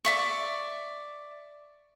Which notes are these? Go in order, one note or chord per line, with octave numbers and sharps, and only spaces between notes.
D5 E5 C#6